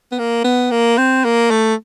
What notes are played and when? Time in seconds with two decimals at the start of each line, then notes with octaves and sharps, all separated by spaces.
0.11 B3
0.19 A#3
0.44 B3
0.71 A#3
0.98 C4
1.24 A#3
1.51 A3